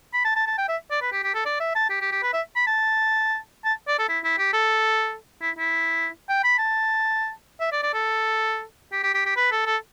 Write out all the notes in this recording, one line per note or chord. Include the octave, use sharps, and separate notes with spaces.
B5
A5
A5
A5
G5
E5
D5
B4
G4
G4
A4
D5
E5
A5
G4
G4
G4
B4
E5
B5
A5
A5
D5
A4
E4
E4
G4
A4
E4
E4
G5
B5
A5
E5
D5
D5
A4
G4
G4
G4
G4
B4
A4
A4